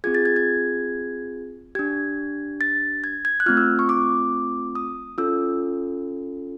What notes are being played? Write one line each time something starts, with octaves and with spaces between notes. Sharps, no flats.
C4 F4 G#4 G#6
A6
G#6
G#6
D4 G4 G#6
A6
G#6
G#6
F#6
A3 C4 F4 F6
E6
C#6
D6
D#6
C#4 F4 A4 E6